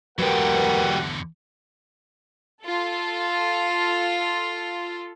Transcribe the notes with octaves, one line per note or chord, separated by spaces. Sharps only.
E2 D3 F#3 A3 G4 A#4 B4 F#5
F4 A4